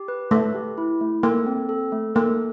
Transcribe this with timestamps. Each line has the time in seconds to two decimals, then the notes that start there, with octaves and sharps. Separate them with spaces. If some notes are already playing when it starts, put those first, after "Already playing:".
Already playing: G4
0.08 B4
0.31 A3 B4
0.55 G4
0.78 E4
1.01 A3
1.23 A#3 A4
1.47 C4
1.69 A4
1.92 A3
2.15 A#3 A4